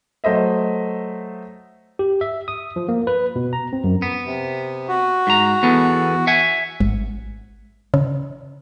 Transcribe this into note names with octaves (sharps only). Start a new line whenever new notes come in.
F#3 A3 C5 D#5 E5
G4
E5
D#6
F3
A#3
B4
B2
A#5
C4
F#2
B3
C3
F#4
G#2 A#5
E2 B3 A4
E5 F#5 G#5
G#1
C#3